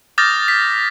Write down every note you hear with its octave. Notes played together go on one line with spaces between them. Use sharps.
D6 D#6 F6 G6 A6 A#6
B6